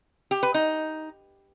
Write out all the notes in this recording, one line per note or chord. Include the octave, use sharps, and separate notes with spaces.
G4
B4
D#4